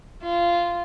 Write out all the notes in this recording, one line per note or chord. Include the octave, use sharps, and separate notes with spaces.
F4